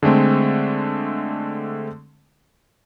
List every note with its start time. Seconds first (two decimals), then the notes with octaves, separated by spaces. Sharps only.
0.02 D3 G#3 A3 C4